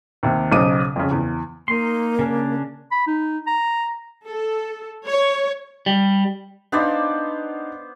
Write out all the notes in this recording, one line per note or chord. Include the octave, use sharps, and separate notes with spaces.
D#2 C3
B1 C#3 C5 D6 D#6 D#7
F2 C#3
E2
A#3 D#4 C6
C#3 C#4 D4
B5
D#4
A#5
A4
C#5
G3
B3 D4 D#4 C5 D5 F5